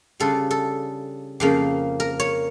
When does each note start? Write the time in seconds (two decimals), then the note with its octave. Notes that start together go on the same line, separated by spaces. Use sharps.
0.20 C#3 G3 D4 F4 A4
0.51 A4
1.40 F2 C#3 F3 A#3
2.00 A#4
2.20 C#5